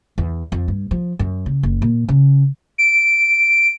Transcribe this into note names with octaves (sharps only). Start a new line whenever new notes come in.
E2
F2
G2
F3
F#2
C#3
F#1
A#2
C#3
D7